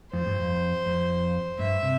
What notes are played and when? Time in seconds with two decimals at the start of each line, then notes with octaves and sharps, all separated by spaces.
0.13 F2 C5
0.26 G2
0.40 F2
0.86 F2
1.59 G2 E5
1.83 C3